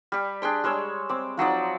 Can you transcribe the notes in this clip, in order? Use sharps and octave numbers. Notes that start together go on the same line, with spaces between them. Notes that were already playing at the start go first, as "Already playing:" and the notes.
G3 G4
D4 G#4 G5 C6
G3 G#3 C#5 E6
C4 D6
F3 F#3 D#4 D5